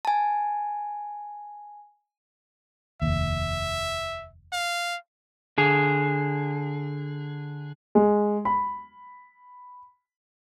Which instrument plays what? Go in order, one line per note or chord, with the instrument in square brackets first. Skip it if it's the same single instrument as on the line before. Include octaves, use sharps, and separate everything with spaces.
[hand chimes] G#5 A5
[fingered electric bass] F1 D#2 [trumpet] E5
[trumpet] F5
[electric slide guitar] D3 G#4
[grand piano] G#3
B5